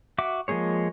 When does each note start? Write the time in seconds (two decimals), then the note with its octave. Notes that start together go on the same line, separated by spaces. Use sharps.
0.18 F#4 E5 D6
0.48 F3 G#3 A#3 G#4 C#5